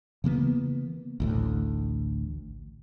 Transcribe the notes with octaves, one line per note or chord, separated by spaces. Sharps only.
C#3 E3 A#3 B3
A1 D2 A2